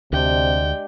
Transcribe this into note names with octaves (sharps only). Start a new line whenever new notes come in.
D2 C3 G#3 D4 G4 G5